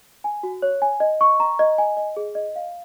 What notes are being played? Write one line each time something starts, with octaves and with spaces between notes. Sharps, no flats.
G#5
F#4
C#5
G#5
D#5
C#6
A#5
D#5
G#5
D#5
G#4
D#5
F5